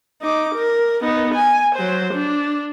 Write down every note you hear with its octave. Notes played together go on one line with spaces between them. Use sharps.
D#4 D6
A#4
B3 D#4
G#5
F#3 C5
D4